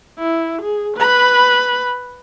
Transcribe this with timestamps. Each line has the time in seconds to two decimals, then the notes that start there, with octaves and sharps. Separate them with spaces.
0.19 E4
0.62 G#4
0.97 B4 B5